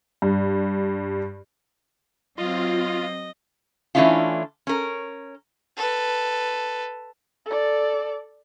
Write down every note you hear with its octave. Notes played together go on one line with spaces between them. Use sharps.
G2
F#3 C4 F4 D#5
E3 A3 C#4 D4 E4 F4
C#4 A#4
A4 B4
A4 D5